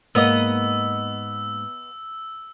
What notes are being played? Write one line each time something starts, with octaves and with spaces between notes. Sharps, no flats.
G#2 A#3 B3 D#5 E6